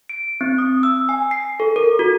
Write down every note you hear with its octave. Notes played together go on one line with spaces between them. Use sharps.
D7
C4
D#6
E6
G#5
C7
A4
A#4
F#4